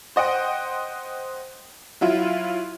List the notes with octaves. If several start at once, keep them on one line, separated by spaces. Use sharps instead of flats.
C5 D#5 F#5 G5
F#3 E4 F4